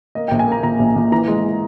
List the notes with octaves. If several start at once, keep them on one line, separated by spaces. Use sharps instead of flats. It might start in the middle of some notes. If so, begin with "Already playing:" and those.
A#3 D#5
A#1 G5
G#5
A#3 A#5
A#2 A#5
A#1
A#2
E3 A#5
G#3